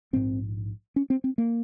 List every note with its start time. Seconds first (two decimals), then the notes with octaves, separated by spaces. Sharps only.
0.13 A#1 G#2 C4
0.96 C#4
1.10 C4
1.24 C4
1.38 A#3